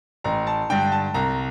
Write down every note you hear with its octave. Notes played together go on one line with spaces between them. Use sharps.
A1 A#5
A5
G2 D3 G5
A5
C2 A#5